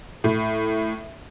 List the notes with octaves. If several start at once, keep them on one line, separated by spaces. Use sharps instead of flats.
A2